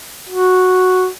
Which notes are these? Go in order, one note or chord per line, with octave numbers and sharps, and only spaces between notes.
F#4